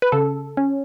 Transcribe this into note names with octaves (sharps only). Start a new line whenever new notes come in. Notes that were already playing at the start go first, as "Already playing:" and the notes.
B4
C#3 A4
C#4